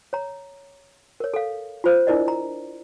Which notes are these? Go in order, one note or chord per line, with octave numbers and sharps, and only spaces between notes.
C#5 A#5
A#4 C#5
A4 F5
F4 C5
D4 E4 A#4 D5 D#5
A#5